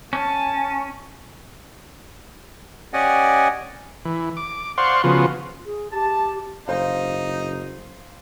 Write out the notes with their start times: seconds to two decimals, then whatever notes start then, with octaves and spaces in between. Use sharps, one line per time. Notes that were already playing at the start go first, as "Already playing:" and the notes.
0.13 C#4 A5
2.93 C#4 G4 D5 D#5 F#5 G#5
4.05 E3
4.37 D6
4.78 C5 D5 F5 F#5 C6 C#6
5.04 C#3 F3 B3 F4 F#4
5.65 G#4
5.92 G4 A5
6.68 F#1 D#4 C5 F5